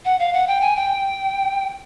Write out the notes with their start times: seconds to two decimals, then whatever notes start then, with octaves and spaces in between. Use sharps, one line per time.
0.05 F#5
0.19 F5
0.33 F#5
0.47 G5
0.61 G#5
0.76 G5